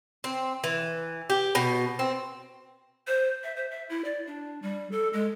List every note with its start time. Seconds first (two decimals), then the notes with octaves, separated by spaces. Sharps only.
0.24 C4
0.64 E3
1.30 G4
1.55 B2
1.99 C4
3.07 C5
3.44 E5
3.57 C5
3.71 E5
3.90 E4
4.05 D5
4.27 D4
4.62 G3
4.91 A4
5.13 G#3